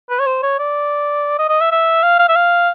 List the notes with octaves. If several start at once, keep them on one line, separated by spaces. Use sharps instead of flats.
B4
C#5
C5
C#5
D5
D#5
D#5
E5
E5
F5
F5
E5
F5